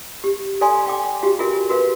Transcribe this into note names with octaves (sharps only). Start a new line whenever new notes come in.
G4
A4 D5 F5 G#5 C6
F5 G5 D6
F#4 G4 F5
F4 F#4 G#4 A#4 E5
F#4 A#4 B4 F5